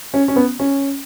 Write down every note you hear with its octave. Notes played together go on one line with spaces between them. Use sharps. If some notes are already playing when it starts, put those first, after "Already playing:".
C#4
C#4
B3
C#4